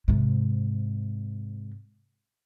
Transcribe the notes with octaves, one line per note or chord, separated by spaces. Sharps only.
G#2 C3